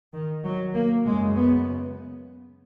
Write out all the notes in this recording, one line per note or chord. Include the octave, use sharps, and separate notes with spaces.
D#3
F#3
A#3
F#2 C#3 G#3
B3